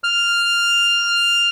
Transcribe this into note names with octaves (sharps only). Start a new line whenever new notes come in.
F6